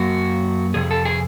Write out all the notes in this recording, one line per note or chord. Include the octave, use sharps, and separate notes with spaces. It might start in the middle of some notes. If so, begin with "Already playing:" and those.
Already playing: F#2 F#3 A#3 F#4
F2 C3 G#4
A4
G#4